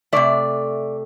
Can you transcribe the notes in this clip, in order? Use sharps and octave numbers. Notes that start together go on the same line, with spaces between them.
C3 E3 A3 D5